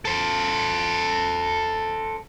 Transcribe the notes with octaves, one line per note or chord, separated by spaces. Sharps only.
A4 C5